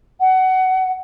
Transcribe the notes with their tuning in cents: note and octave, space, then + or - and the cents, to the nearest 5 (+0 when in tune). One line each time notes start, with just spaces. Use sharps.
F#5 +20